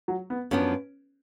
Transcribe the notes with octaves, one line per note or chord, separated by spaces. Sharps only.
F#3
B3
F#2 F3 B3 C#4 D4